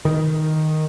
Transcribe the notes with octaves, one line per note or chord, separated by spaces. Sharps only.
D#3